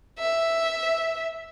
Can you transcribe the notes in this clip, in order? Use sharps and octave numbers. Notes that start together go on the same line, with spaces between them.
E5